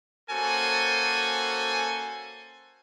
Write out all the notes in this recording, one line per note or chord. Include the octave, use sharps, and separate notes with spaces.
A#3 C#4 F#4 A4 C5 G#5